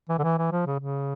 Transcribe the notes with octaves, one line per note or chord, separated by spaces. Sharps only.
E3
D3
E3
E3
F3
C#3
C#3